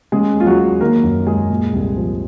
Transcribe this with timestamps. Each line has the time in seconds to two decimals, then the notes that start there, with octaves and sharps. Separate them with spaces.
0.12 C#3 G#3 G#4
0.34 D#2
0.40 F4
0.46 F#3 F#4
0.58 F#3
0.80 D#3 A#3 A#4
1.04 F#2
1.27 F#3 G#3 G#4
1.50 A#2
1.73 C2
1.97 F3